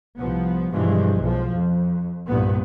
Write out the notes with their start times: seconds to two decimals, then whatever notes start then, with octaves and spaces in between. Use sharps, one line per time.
0.19 C2 F3 B3
0.73 G2 B2 E3 F3 G#3
1.22 B1 F3
1.55 F2
2.27 C2 G2 A#2 B3